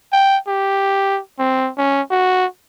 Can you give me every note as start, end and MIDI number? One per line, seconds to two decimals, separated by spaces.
0.12 0.37 79
0.48 1.20 67
1.39 1.70 60
1.77 2.01 61
2.11 2.45 66